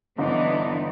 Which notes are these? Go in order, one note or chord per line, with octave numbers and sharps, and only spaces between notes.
G1 E3 B3 D4 D#4 D#5